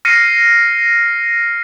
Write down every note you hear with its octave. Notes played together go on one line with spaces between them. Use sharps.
F6 A#6 C7 C#7 D#7